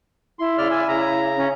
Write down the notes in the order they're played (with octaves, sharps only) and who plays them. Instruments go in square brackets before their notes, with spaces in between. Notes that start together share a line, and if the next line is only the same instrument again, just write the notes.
[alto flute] E4 [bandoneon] C6
[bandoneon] C#3 D5 F6
G#5 E6
C#3 A#5
[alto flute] C#4